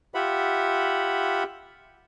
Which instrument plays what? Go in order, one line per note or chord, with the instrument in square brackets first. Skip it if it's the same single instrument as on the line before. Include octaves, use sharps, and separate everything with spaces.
[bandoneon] F4 G4 E5 F#5 B5